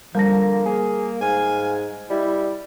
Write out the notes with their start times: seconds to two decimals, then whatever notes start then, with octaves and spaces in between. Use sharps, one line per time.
0.15 D3 F3 G3 A#3 A5 A#6
0.66 A#3 G#4
1.21 G#2 F5 G#5
2.10 G3 E4 D#5